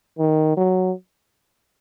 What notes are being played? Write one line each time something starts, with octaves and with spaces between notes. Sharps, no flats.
D#3
F#3